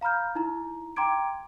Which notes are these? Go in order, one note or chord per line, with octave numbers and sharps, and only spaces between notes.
F5 A#5 B5 F6 G6
D#4 E4 A#5
G5 A#5 C6 D6 G#6 D7